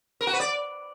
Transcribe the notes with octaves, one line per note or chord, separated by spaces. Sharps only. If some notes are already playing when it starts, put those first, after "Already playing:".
A#4
F#4
B4
D5